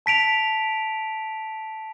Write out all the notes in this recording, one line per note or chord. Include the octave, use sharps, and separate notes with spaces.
A5 B6 D7 F7